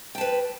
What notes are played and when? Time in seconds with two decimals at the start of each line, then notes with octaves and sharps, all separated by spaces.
0.15 G5
0.18 A5
0.21 B4